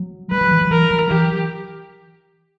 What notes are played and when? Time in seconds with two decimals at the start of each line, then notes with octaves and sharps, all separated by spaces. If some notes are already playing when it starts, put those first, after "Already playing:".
Already playing: F#3
0.31 G3 B4
0.41 F#3
0.51 E3
0.61 F#3
0.70 E3 A#4
0.91 F#3
1.10 E3 G4